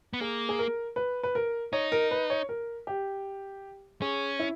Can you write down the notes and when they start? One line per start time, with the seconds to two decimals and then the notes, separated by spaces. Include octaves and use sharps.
0.13 B3
0.20 A#3 G#4
0.49 G#4
0.59 A#4
0.96 B4
1.23 B4
1.35 A#4
1.73 D#4 C#5
1.92 A#4
2.11 B4
2.30 C#5
2.49 A#4
2.87 G4
4.02 C#4 G#4
4.39 E4